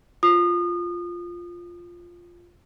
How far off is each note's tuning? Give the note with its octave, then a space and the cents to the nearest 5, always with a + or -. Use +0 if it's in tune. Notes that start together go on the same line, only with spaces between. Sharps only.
F4 +0 D#6 -30